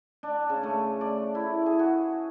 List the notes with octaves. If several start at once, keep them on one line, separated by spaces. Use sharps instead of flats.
D4
C#3
A3
D5
E4
G#4
F#4